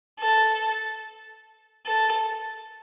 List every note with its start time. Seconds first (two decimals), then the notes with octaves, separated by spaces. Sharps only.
0.20 A4
1.86 A4